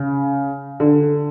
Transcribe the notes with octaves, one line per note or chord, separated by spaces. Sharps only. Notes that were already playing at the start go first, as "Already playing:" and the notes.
Already playing: C#3
D3